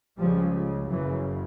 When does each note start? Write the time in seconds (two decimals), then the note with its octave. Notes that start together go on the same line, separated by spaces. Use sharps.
0.18 C#2 C#3 F3 G3
0.88 F#1 F#2 C#3 E3 F#3